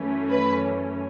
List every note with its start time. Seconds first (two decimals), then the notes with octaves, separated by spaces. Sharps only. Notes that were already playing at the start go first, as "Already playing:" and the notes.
Already playing: F#2 E3 A3 C#4
0.31 B4